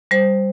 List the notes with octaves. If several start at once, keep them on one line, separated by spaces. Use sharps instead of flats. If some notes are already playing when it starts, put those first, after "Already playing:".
G3 C5